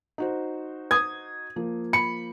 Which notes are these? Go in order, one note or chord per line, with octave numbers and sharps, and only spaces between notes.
D#4 F#4 C5
D#6 G#6
F3 A#3
B5 C#7